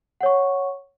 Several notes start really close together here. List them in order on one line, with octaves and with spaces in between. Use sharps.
F#5 C#5 C#6